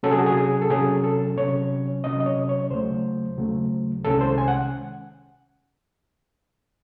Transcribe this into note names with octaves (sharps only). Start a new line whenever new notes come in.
C3 F#3 C#4 A4
G#4
F#4
G#4
G#4
A4
C3 F#3 C#4 G#4
A4
C3 F#3 C#4 C#5
C3 F#3 C#4 D#5
D#5
C#5
C#5
D#2 C#3 F#3 A3 C5
D#2 C#3 F#3 A3
C2 C3 D#3 G#3 C#4 A4
C5
G#5
F#5